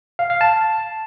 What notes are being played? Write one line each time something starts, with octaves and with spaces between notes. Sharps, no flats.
F5
F5
A5